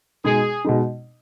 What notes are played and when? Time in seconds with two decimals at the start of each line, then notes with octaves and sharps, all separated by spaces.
0.24 B2 G#3 D#4 G#4
0.65 B2 G#3 D#4